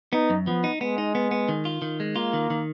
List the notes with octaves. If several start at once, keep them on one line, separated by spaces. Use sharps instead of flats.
B3 D#4
F#2
F3 B3
D#4
G#3 B3
D#4
B3
B3
D#3
F4
D#3
G#3
A#3 F4
D#3
D#3